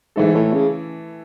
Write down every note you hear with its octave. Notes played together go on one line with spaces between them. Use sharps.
G#2 E3 A3 E4 A4
A2
C#3